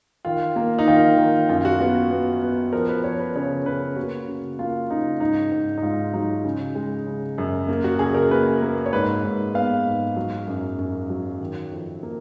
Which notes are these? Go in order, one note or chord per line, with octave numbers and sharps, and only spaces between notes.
D#3 F4
A#3
D#4
D#3 F4
D#3
F#2 F4
F#4
B3 F#4
B3
B3
F3 A#4
B4
F3 C#5
B4
C#3 C#5
C#3 B4
A#3 F#4
C#3
A#3 F4
C#3 D#4
G#2 D#4
G#2
D#4
G#2 F4
F#3 D#4
C#3
G#3
C#3
F#2
A#3
F#4
C#3 G#4
A#4
A#3 B4
A#3
C#5
G#2 B4
G#2
B3 F5
G#2
F#3
F#2
F#2
F#3
D#3
F2
A#3